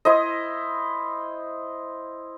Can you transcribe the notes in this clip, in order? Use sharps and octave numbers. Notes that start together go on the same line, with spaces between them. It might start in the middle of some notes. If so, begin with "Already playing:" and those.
E4 C5 D#5